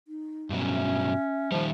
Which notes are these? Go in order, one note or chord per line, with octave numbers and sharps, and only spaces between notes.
D#4
G2 B2 F#3 C#4
E5
D#3 F3 G3